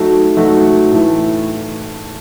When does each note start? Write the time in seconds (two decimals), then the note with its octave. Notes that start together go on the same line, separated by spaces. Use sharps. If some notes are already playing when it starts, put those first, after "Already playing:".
Already playing: F#3 A3 D#4 F#4 A4
0.37 F#3 A3 D#4 F#4 A4
0.91 A2 E3 A3